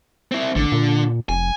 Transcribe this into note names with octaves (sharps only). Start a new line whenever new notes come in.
C4 E4
A1 D3
A#2
F1 G#5